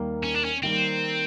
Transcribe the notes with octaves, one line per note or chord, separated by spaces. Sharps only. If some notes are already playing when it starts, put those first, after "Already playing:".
Already playing: D#2 D#3 G3 A#3
C#4
D4
C#4
D#3 G3 A#3 C4